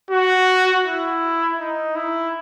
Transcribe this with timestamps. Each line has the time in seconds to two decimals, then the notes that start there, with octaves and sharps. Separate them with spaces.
0.11 F#4
0.85 E4
1.59 D#4
1.95 E4